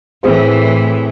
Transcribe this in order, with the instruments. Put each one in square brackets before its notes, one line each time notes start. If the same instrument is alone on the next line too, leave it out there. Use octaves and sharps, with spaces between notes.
[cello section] A2 E3 [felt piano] C4 G#4 C5